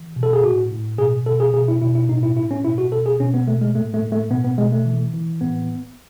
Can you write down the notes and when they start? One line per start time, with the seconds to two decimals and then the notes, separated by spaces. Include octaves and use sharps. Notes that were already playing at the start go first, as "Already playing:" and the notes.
Already playing: E3
0.16 B2
0.23 A4
0.33 G#4
0.43 A2 F#4
0.71 A2
0.98 B2 G#4
1.26 B2 A4
1.40 G#4
1.54 B2 G#4
1.68 E4
1.82 B2 E4
1.95 E4
2.09 A2 D#4
2.23 E4
2.37 A2 E4
2.51 C#4
2.64 B2 E4
2.78 F#4
2.92 B2 A4
3.06 G#4
3.20 B2 C#4
3.34 B3
3.47 B2 A3
3.61 G#3
3.75 A2 A3
3.94 A3
4.03 A2
4.12 A3
4.30 B2 B3
4.44 B3
4.58 B2 G#3
4.72 A3
4.86 E3
5.13 E3
5.41 A2 B3